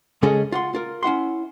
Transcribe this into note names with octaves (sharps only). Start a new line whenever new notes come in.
C#3 G#3 C#4 G#4 A4 D#5
F4 F#5 C6
F4 A#4
C#4 E4 F#5 C6